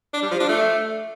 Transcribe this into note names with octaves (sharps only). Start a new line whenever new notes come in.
D4
G3
F3
D4
A3